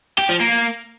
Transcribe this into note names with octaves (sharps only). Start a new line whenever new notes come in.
G4
F3
A#3